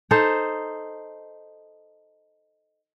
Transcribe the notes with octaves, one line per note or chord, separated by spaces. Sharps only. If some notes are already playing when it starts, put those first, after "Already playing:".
D#4 A4 C5